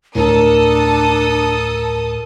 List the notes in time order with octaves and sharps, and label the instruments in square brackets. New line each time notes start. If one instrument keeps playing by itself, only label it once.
[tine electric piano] D2 A2 [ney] D4 [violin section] A4 A5 D#6 [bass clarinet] A#4